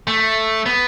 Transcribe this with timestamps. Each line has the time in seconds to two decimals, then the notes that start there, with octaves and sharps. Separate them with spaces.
0.07 A3
0.66 B3